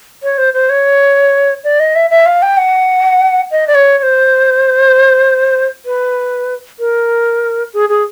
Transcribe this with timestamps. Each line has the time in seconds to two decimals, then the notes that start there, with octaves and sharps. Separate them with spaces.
0.23 C#5
0.38 C5
0.54 C5
0.70 C#5
1.64 D5
1.80 D#5
1.95 E5
2.10 E5
2.26 F5
2.42 G5
2.57 F#5
3.51 D#5
3.67 D5
3.75 C#5
3.98 C#5
4.03 C5
5.86 B4
6.79 A#4
7.74 G#4
7.89 G#4